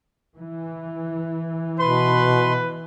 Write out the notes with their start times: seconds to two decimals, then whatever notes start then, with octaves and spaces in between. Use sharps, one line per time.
0.36 E3
1.80 B2 B4 C6